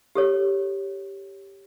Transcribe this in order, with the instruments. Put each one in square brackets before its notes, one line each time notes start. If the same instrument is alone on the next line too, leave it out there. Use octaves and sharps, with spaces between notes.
[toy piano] G4 A4 C#5